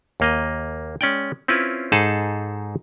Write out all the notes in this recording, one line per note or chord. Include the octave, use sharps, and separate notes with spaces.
D#2 A#3 D#5
G#3 C#4 D5 G5
C4 C#4 E4 F4 B4 C#5
G#2 D#4 G#4 A4 C5 A5